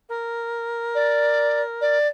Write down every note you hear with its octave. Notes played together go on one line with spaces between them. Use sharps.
A#4
D5
D5